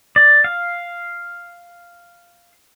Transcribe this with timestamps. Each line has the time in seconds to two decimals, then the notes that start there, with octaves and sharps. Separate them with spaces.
0.16 D5
0.44 F5